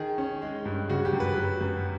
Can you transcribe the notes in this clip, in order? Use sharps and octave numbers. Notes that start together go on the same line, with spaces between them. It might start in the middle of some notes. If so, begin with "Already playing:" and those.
Already playing: D#3 G#4
C#4
G#3
G2
C#3 F#4
G4
F#2
B4
F#3
F#2